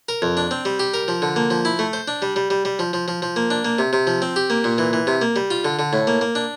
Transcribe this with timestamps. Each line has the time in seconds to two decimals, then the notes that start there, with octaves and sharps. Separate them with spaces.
0.09 A#4
0.22 F2
0.37 D4
0.51 C4
0.65 G3
0.79 G4
0.94 A#4
1.08 F3
1.22 D3
1.36 A#3
1.50 F3
1.65 E4
1.79 A3
1.93 C5
2.08 D4
2.22 G3
2.36 G3
2.50 G3
2.65 G3
2.79 F3
2.93 F3
3.08 F3
3.22 F3
3.36 A#3
3.51 D4
3.65 A#3
3.79 C3
3.93 C3
4.07 F3
4.22 C4
4.36 G4
4.50 A#3
4.64 A#2
4.78 E3
4.93 E3
5.07 C3
5.21 A#3
5.36 G3
5.51 F4
5.65 D3
5.79 D3
5.93 A2
6.07 A#3
6.21 A#3
6.35 D4